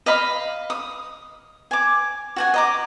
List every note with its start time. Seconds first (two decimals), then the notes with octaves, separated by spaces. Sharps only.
0.06 D#5 F5 B5
0.70 D#6
1.71 G#5 D6
2.36 F#4 F#5 G#5
2.54 D#5 A#5 D6